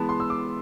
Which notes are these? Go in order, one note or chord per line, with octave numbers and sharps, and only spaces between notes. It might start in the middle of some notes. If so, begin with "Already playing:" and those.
Already playing: E3 G#3 B3 A5
C6
E6
D6